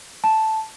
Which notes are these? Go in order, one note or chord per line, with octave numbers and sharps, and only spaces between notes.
A5